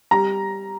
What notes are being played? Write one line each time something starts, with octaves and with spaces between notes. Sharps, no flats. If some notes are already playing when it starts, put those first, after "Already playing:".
G3 A#5